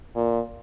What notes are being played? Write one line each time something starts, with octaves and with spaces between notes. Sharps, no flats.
A#2